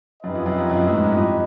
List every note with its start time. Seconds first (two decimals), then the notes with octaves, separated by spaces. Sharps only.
0.23 F#2 D#4 G4 B4 D#5
0.35 F2
0.46 F#2
0.58 F2
0.70 F#2
0.76 F2
0.81 F#2
0.87 A2
0.92 G#2
1.04 G2
1.15 F2